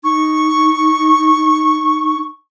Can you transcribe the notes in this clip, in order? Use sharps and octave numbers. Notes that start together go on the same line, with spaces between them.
D#4 C#6